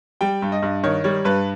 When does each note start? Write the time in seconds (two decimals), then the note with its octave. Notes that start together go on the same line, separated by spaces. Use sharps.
0.21 G3 G5
0.42 G2
0.52 D#5
0.62 G2
0.83 D#3 C#5
1.04 G3 C#5
1.25 G2 B4